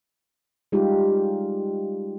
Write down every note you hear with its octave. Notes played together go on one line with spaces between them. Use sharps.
G3 G#3 D#4 F4 G4